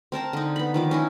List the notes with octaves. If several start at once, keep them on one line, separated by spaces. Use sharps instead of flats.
C4 A#4 A5 A#5
D3 D#4
B3 B5
D#3 F3 D6
C#4 D#4 E4